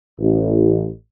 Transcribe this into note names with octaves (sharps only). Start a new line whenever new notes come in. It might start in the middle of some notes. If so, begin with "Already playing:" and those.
A1